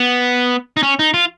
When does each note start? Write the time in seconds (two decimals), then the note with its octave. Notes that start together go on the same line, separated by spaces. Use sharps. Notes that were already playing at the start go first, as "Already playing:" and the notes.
Already playing: B3
0.77 D#4
0.83 C#4
0.99 D#4
1.14 F4